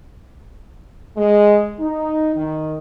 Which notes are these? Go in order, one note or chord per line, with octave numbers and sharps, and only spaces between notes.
G#3
D#4
D#3